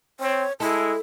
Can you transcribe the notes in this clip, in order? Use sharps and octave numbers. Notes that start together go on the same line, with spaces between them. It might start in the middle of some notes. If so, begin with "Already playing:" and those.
C4 C#5
G#3 E4 A4